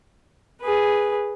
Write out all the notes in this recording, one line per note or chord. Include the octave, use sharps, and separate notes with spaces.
G#4 B4